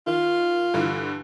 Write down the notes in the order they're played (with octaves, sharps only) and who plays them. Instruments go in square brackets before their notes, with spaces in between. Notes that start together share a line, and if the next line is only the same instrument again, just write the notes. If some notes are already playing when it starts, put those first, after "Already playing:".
[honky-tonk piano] D#3 [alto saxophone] F4
[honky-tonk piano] G2 D3 E3